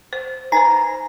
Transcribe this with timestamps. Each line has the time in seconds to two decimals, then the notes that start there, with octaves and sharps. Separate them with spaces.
0.13 C5
0.52 D#4 B4 C5 G#5 A#5